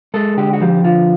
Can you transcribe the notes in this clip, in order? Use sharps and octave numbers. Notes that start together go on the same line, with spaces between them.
G#3 A4
D3 G4
F#4
F3 G4
D3 F4